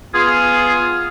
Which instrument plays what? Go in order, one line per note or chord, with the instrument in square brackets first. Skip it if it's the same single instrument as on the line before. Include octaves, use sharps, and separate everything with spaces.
[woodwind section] B3 F4 G#4